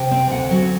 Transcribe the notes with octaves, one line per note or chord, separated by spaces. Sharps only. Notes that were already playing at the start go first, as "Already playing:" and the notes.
Already playing: C3 G5
C4
D2 F#5
F#3